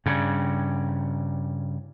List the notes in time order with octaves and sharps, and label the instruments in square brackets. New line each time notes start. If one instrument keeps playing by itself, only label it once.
[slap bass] G2 C#3